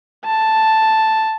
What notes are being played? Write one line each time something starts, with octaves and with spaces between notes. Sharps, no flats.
A5